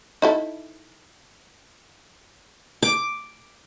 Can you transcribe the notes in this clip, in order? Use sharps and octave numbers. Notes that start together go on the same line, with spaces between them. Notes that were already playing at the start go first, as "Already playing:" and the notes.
D#4 E4 A4
D6